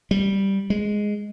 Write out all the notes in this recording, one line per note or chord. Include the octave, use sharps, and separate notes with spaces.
G3
G#3